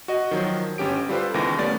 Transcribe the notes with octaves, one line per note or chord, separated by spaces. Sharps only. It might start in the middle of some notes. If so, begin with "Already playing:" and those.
F#4 D#5
D#3 F3 F#3
G1 C#4 G4 D7
G3 F4 A4 B4 C5
C#2 D#3 E3 B3 D6 A#6
G3 A3 B3 C#4 D5 A6